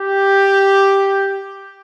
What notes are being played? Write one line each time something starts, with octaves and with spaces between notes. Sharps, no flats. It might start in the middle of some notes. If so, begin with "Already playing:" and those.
Already playing: G4